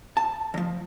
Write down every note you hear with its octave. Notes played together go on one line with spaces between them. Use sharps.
A5
E2 F3